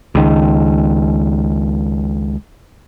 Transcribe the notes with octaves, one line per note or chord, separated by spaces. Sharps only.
C#2 D#3